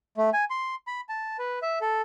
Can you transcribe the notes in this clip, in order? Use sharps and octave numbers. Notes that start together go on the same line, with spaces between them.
A3
G#5
C6
B5
A5
B4
E5
A4